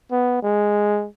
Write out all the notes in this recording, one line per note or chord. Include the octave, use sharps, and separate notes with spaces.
B3
G#3